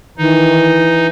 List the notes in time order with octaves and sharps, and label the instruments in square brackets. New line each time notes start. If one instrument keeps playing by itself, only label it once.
[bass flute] D#3 [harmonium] E3 [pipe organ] D#4